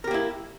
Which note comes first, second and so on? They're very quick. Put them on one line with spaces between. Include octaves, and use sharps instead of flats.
A#4 G4 A#3 E4